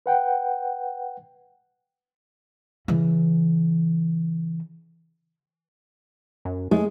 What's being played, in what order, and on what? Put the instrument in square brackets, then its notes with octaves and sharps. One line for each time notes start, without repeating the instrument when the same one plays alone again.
[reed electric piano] B4 F#5 G5
[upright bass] C#3 E3
[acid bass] F#2
[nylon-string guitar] G#3 [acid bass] A3